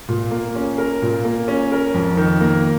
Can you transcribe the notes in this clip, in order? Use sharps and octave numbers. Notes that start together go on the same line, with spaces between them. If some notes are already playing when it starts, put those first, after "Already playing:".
A#2
A#3
C#4
A#4
A#2
A#3
C#4
A#4
F2
D#3
A#3